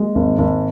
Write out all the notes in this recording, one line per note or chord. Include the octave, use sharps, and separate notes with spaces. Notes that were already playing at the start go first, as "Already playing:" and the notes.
Already playing: G#3 A#3
G#1
G#1